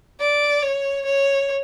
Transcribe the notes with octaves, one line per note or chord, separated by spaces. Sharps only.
D5
C#5
C#5